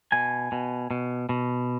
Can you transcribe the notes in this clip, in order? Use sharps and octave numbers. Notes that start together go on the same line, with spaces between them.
B2 G#5
B2
B2
B2